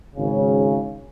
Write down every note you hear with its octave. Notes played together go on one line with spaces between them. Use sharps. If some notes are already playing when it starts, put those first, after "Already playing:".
G#1 C#3